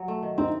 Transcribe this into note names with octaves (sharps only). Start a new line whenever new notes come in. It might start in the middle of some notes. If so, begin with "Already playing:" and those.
Already playing: F#3
A3
D#3
C4 D#4